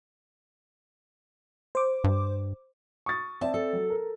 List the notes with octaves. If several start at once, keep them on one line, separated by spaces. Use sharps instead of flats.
C5 D6
G2
C#6 D#6 A6
C4 D5 E5 A5
A4
F#3
A#4